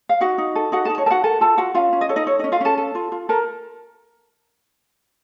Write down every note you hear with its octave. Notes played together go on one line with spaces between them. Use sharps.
F5
D#4 F#4 F#5
D#4
A4
D#4 F#4 F#5
D#4 A4 A5
C#5
A#4 A5
F#4 F#5
A4 A#4 A5
F4 A4 A5
F4 F#4 F#5
C#4 F4 F5
C#4
D#5
A4 C#5
D#4 D#5
A4 C#5
C#4 D#4 D#5
F4 F5
C#4 A4 A5
A4
F4
F4
A4 A#4 A#5